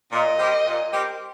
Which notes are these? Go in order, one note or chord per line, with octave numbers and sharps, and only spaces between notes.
A#2 D#5
G3 C4 G4 A#4
A#2
G3 C4 G4 A#4